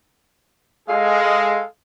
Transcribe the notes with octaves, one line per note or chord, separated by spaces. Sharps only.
G#3 G#4 A4 F5